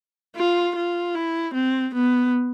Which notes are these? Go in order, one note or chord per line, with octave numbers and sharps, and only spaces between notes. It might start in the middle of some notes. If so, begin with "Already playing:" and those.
F4
F4
E4
C4
B3